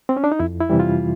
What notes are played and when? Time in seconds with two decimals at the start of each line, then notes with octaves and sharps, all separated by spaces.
0.09 C4
0.17 C#4
0.24 D4
0.32 D#4
0.40 F2 E4
0.60 E4
0.70 C3 E3 G3
0.80 F4